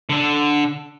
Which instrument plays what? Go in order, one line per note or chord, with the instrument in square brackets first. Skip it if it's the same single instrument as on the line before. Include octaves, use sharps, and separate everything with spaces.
[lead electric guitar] D3 A4